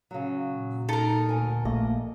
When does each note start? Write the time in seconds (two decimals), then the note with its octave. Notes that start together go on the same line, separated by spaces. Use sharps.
0.11 C#3 F#3
0.52 A#2
0.89 D#4 A4 A#4
1.29 D2 G#5
1.65 A#1 A3 A#3 D#5